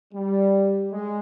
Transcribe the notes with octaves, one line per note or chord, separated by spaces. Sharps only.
G3
G#3